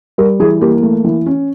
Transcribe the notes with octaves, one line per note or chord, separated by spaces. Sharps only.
G3 A#4
E3 G#4
A#3 G4
A3
E3
C#4